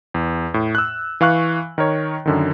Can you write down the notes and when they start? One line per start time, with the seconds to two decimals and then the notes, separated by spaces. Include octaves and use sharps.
0.14 E2
0.54 A2
0.75 E6 F#6
1.21 E3 F5 C#6 F#6
1.78 D#3 A#4 C#5
2.26 F#2 D3 D#3